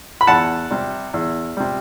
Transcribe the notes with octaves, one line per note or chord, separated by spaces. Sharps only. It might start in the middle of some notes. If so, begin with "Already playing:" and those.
B5
E2 F#5 A5
C3 G3
E2
C3 G3